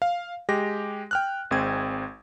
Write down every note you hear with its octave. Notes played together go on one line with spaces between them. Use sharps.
F5
G#3 G4 A#6
G5 F6 F#6
G#1 G#3 C4 G#6